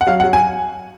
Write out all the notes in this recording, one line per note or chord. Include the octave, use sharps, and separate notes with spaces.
F#5
F#3 F5
F#5
F#3
G#5